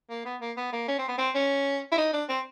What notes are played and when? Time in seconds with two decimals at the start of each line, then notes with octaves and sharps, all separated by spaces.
0.10 A#3
0.25 B3
0.41 A#3
0.57 B3
0.72 A#3
0.88 C#4
0.98 C4
1.08 B3
1.18 C4
1.35 C#4
1.92 E4
1.98 D#4
2.13 D4
2.29 C4